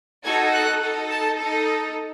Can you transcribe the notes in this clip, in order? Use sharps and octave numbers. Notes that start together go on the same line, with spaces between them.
D#4 F#4 A4 G#6
F#6
D#4 A4
A5
A4
D#4